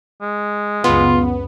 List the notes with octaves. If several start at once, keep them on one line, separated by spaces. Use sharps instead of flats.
G#3
C#2 F#2 C#3 B3 F4